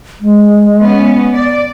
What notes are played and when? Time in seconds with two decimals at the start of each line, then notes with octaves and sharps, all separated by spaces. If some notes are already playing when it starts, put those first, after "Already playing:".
0.21 G#3
0.82 B3 C#4
1.34 D5